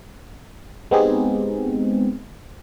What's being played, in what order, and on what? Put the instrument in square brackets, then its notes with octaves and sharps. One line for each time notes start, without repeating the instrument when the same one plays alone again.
[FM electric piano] G#3 B3 C4 D#4 G4 G#4